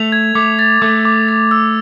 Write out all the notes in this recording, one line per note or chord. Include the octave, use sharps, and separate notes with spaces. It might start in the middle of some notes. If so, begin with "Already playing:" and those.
Already playing: A3 F7
G#6
A3 D6
A6
A3 D6
D6
A6
E6